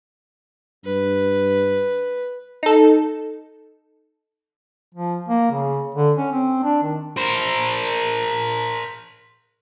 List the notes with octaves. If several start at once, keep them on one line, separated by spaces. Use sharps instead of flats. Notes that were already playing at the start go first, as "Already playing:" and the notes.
G2 B4
D#4 A4
F3
A#3
C#3
D3
C#4
C4
D4
D#3
A#4 C5